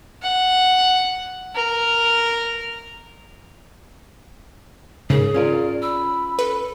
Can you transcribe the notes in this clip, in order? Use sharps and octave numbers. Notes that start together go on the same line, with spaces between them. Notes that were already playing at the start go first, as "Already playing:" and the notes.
F#5
A#4
G#2 C#3 G#4 A#4
C#4 F4 A#4 D5
B5 E6
A4 B4